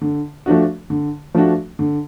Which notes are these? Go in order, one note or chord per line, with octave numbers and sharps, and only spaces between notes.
D3
F3 A3 D4 F#4
D3
F3 A3 D4 F#4
D3